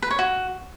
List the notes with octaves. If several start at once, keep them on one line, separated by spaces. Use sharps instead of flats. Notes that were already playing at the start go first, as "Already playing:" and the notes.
B4
C#5
F#4